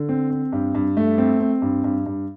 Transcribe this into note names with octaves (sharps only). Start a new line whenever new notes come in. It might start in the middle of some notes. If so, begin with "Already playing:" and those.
Already playing: D3
C4
C4
G2
G2
A3
C4
C4
G2
G2
G2